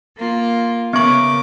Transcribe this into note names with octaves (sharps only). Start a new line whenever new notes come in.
A#3 F4
C#3 B3 A#4 C#6 D6